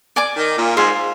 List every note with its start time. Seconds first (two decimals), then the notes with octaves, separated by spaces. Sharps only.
0.16 D5 G#5 D6
0.36 D#3
0.57 A#2
0.77 G#2 C5 F5 G#5